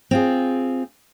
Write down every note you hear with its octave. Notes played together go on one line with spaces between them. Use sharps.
C4 F4 G#4